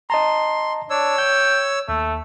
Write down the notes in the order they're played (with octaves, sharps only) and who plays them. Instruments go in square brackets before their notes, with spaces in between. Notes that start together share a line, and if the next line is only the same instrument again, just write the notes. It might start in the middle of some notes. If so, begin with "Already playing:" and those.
[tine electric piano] D#5 A5 A#5 [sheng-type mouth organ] C6
[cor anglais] D4 [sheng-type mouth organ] C#5 E6
[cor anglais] G5 [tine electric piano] G6
[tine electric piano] D#2 [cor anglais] A3